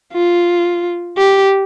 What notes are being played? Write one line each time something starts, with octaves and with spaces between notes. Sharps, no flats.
F4
G4